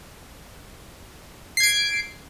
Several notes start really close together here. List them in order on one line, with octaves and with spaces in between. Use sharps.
C7 G#6 D7